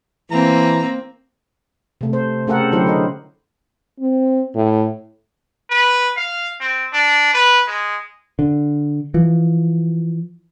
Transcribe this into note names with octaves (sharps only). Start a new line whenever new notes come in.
E3 A#3 C4 A#5
C3 A3
C5
C#3 A3 G4 A4 A#4 F#5
D3 F#3 E4 G4 C5
D3 A#4 D#5
C4
A2
B4
F5
C4
D4
B4
G#3
D3
E3 F3